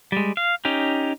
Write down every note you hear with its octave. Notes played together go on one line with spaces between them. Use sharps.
G3 G#3
F5
C#4 D#4 G4